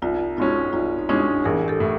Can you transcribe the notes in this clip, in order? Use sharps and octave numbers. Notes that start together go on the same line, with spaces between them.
C2 D#4 F4
B2 G#3 C#4 D#4 F4
C2 D#4 F4
D#4
B2 G#3 C#4 D4 E4
A1 G#4 A#4
G4 A4
A2